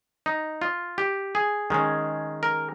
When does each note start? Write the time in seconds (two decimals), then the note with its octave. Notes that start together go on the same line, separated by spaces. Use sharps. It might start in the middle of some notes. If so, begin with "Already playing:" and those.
0.26 D#4
0.62 F4
0.98 G4
1.35 G#4
1.70 D#3 G#3 C#4
2.43 A#4